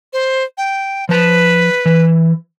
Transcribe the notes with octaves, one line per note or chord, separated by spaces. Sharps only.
C5
G5
F3 B4 A5
E3